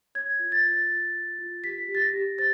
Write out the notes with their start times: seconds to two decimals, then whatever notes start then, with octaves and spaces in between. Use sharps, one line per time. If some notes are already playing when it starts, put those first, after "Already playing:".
0.15 C#5 G#6
0.39 F4
0.52 A6
0.65 F4
0.90 F4
1.15 F4
1.39 F4
1.64 G4 B6
1.88 G4
1.95 A6
2.02 A#6
2.13 G4
2.38 C5 A6